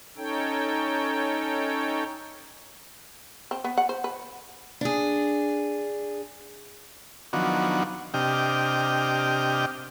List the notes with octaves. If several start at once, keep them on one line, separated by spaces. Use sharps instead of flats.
C#4 D#4 A4 C#5 G5
C4
B3
F#5
C5
B4
D4 G#4
D#3 F3 F#3 B3 D4 F#4
C3 D4 G4 D#5 G5 F6